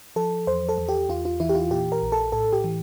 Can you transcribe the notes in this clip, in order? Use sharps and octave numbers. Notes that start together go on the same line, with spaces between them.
F3 A4
E2 C5
A4
E2
G4
E2 F4
F4
E3 E4
G4
F4
A#2 G4
A#4
A#1
A4
A2 A4
G4
E3